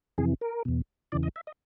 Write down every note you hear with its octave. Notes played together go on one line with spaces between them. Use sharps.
F2 C3 E3 G#4
A#4
E2 B2
E2 C#3 E3 D5
D#5
E5
D#5